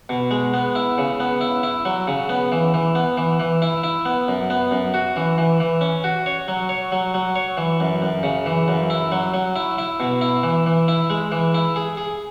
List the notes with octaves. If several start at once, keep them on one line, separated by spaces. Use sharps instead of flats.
B2
G#3
B3
E4
C#3
B3
E4
E4
F#3
C#3
B3
E3
E3
B3
E3
E3
E4
E4
B3
F#2
B3
F#2
F#4
E3
E3
E3
C#4
F#4
C#5
F#3
C#5
F#3
F#3
C#5
E3
F#2
F#2
C#3
E3
F#2
E4
F#3
F#3
E4
E4
B2
E4
E3
E3
E4
G#3
E3
E4
G#4
G#4